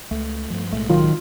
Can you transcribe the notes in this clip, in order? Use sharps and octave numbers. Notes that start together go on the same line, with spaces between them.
C#2 A3
G2 F3
B1 A2 G#3 A3
D#3 F#3 F4